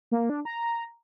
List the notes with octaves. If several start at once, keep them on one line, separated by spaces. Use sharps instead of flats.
A#3
D4
A#5